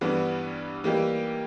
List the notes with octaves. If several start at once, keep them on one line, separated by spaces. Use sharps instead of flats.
G2 E3 G3 B3
E3 G3 A#3 D#4 G4